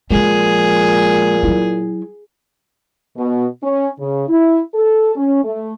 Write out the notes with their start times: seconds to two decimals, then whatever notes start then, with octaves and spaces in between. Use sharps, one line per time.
0.11 A#2 F3 G#3 G#4
1.43 F#3 E4
3.17 B2
3.63 C#4
3.99 C#3
4.29 E4
4.75 A4
5.16 C#4
5.45 A3